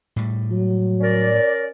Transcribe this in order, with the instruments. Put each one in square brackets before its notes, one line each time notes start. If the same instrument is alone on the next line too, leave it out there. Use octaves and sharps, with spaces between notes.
[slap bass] A2 G3
[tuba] F#3
[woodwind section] C#4 A#4 D5